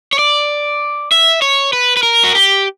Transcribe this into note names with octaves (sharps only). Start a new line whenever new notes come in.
C#5
D5
E5
C#5
B4
B4
A#4
F#4
G4